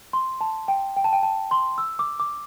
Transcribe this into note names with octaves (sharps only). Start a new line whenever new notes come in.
C6
A5
G5
G5
A5
G5
A5
C6
E6
D6
D6